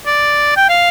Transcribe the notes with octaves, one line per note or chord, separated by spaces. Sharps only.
D5
G5
F5